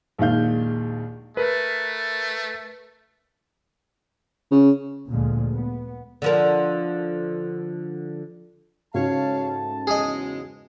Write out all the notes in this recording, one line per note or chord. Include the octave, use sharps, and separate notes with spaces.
A#1 D#2 D#3 G#3 F5 G6
A3 A#4 B4
C#3
D2 A#2 F3 G#3
B3
D3 F3 A#4
G#2 C#3 A3 F#4 A4 C#5 F5 A5
E2 F#3 G#3 G#4 D#5